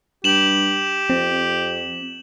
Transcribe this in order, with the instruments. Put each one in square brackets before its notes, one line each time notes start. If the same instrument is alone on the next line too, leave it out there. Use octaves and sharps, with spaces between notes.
[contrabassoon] G2 [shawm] G4 [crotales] E7 F#7
[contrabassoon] F2 [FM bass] C4